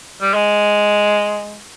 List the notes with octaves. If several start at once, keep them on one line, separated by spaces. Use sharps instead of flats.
G3
G#3